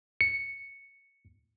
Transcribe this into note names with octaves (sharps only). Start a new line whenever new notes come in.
C#7